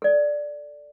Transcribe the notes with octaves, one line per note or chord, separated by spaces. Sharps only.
A4 D5